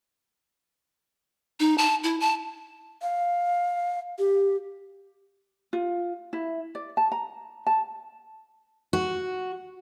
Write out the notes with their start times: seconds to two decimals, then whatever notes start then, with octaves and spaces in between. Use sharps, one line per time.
1.60 D#4
1.78 A5
2.04 E4
2.20 A5
3.02 F5
4.19 G4
5.73 F4
6.33 E4
6.75 D5
6.97 A5
7.12 A#5
7.67 A5
8.93 F#4